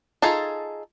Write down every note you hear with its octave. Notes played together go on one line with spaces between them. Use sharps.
D#4 F4 G#4 A4 A5